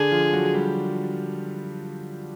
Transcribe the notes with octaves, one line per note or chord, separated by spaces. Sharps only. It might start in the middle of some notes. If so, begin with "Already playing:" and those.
Already playing: D3 D4 G#4
F3 F4
F#3 F#4
G3 G4